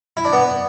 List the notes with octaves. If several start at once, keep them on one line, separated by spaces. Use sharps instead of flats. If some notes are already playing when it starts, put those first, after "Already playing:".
E4
D4
B3